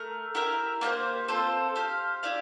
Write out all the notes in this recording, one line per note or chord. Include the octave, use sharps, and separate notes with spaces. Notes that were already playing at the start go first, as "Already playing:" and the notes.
Already playing: A3 A#4
E4 G4 A#4 E5
A#3 D4 G4 C5
C4 F4 A4 C5
G4 C5 F5
E4 G4 D5 F5